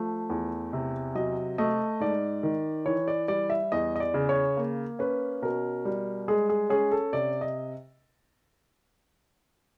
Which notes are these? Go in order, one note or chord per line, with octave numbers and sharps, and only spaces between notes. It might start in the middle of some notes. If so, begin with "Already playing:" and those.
Already playing: F3 A3
E2
C3
F#3 D#5
A3 D#5
G#2 D5
D#3
E3 C#5
D5
G3 D5
E5
E2 D#5
D#5
D5
C#3
C#5
A#3
C#4 B4
B2 A#4
G3
G#3 G#4
G#4
C#4 G#4
A4
C3 D5
D#5